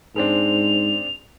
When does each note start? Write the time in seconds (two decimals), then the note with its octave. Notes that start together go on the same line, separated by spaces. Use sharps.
0.16 G#2 G#3 C4 D4 F7